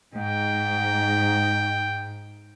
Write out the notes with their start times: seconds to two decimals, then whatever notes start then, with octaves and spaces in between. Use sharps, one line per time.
0.14 G#2 G5